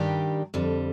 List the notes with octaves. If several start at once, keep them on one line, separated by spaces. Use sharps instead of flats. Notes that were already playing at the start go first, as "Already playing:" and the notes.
Already playing: G2 D#3 G3 D4 G4
F2 D3 G3